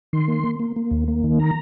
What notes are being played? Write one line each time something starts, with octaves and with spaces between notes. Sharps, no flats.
D#3 C6
A#3
A#3
A#3
A#3
D#2
A#3
D#3
A#5